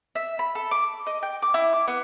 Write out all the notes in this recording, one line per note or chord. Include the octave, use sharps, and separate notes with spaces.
E5
B5
A4
D6
D#5
G5
D6
E4
D6
B3